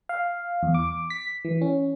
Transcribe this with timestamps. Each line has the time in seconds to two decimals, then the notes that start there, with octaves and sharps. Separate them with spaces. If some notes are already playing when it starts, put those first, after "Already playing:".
0.09 F5
0.63 E2
0.74 D6
1.10 B6
1.45 E3
1.61 C#4